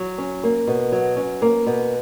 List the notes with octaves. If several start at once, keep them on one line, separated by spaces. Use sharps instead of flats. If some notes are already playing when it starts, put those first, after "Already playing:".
Already playing: F#3
C#4
A#3
B2
F#3
C#4
A#3
B2